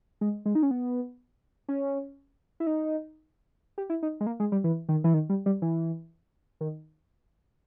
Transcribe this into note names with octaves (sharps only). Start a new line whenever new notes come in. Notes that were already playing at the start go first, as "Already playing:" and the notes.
G#3
G#3
D#4
C#4
B3
C#4
E4
D#4
G4
E4
D#4
G#3
A#3
G#3
G3
E3
D#3
E3
D#3
G3
G3
E3
D#3